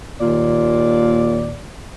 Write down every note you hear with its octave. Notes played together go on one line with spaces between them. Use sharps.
D#2 A#2 D5